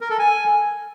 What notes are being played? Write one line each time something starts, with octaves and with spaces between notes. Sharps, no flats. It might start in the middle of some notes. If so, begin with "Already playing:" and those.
A#4
A4
G#5